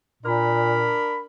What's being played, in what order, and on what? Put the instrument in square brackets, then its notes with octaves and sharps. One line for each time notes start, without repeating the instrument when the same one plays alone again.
[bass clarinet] A#2 [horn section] D4 A#4 B5